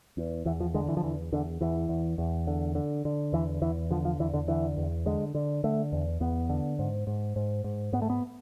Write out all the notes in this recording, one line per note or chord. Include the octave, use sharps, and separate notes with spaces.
E2
E2 E3
F3
D3 G#3
E3
F3
E2 E3
E2 D3
E2 E3
E2
E2
D3
D3
D3
E2 E3
E2 E3
D3 F3
F3
E2 E3
D3
D3 E3
E2
D3 G#3
D3
D3 A3
E2
E2 B3
D3
G#2
G#2
G#2
G#2
G#2 B3
A3
B3